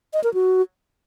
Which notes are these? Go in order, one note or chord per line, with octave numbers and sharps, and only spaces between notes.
D#5
A#4
F#4